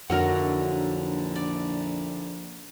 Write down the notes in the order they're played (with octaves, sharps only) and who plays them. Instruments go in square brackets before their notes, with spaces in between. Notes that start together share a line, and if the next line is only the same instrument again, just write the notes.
[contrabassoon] A#1 [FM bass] F2 [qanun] D3 F#3 A#4 [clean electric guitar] D#4 E4 F#5
[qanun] D5